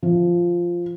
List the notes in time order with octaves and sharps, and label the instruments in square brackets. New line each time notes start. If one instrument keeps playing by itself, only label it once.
[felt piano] F3